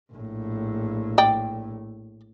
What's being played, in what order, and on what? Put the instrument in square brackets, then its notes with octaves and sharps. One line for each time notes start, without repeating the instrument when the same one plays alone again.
[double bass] A#1 A2
[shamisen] D5 G5